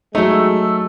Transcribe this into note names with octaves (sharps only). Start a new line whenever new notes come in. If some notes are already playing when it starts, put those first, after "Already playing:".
F#3 G#3 A3 D#4 E6